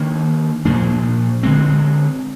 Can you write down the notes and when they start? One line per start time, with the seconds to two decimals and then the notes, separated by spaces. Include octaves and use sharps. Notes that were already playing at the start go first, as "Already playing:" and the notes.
Already playing: D#3 A#3 D4
0.65 A#2 F3 A#3 D4
1.43 D3 G#3 C4